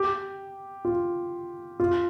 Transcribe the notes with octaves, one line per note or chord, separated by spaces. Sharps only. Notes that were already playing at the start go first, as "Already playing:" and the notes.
Already playing: G4
F4
F4